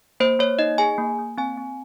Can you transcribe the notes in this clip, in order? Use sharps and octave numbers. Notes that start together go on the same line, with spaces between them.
A#3 C5
A#3 C#5
D#4 D#5
G#4 G#5
A#3
A#3
C4 G#5
C4